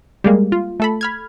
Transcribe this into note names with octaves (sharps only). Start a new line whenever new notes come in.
G3 G#3 A#3
F4
A3 A4 B5
B5 F6 G#6